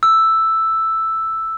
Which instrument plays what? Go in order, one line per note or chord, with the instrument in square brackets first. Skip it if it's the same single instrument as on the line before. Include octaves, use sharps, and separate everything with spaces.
[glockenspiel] E6